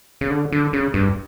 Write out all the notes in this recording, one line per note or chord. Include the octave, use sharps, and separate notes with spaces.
C#3
D3
D3
C#3
G2